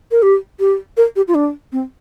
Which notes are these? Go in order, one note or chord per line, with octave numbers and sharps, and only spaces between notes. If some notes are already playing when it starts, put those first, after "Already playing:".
A#4
G4
G4
A#4
G4
F4
D4
C4